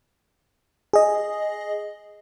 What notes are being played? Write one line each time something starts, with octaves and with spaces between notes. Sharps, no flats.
G#4 D#5